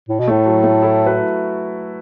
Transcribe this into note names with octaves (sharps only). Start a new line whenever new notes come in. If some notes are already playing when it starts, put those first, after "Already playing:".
A2
B2
A2 A3
F#3
A3
E4 A4
F#4 B4